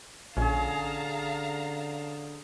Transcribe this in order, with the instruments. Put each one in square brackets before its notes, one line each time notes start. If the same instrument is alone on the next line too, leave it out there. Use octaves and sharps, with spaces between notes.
[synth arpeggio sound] A#1 [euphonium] D3 [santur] C#4 G#4 [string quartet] F5 A5 A#5